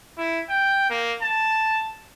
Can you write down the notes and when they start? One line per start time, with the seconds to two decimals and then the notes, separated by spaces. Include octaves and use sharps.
0.17 E4
0.49 G5
0.90 A#3
1.22 A5